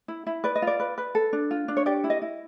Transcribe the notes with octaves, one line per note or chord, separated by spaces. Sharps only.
E4
E4
B4 D5
D#5
F4 D5
B4
B4
A4
D4
F4
D4
C#5
G4 D5
E4
D#5
E4